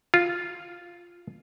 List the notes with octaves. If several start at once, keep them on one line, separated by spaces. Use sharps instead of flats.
F4